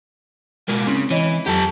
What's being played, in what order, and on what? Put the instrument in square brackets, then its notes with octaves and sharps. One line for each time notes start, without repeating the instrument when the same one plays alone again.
[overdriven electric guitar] B2 A#3 [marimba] G#3
[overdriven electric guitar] C#3 [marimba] C4 E4
[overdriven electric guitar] E3 [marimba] C#5 D#5
[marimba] F2 F#3 [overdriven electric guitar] G4 A4